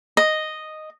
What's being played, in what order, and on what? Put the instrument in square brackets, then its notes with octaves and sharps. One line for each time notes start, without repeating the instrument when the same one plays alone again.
[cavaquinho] D#5